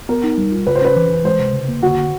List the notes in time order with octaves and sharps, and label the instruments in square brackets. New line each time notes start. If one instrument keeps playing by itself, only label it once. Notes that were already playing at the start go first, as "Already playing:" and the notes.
[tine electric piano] B3 [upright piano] A#4
[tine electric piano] D#4
G3
F4
[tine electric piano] C#3 [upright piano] B4
[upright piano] C5
[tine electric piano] C#4 [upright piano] B4
[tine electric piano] E3
E3
[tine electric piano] G#3 [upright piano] C5
[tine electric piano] C3
C#3
A#3
[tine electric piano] D3 [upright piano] F#4
[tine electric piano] D3